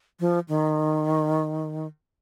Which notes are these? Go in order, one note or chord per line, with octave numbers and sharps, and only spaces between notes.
F3
D#3